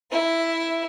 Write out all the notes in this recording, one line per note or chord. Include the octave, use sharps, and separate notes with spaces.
E4 E5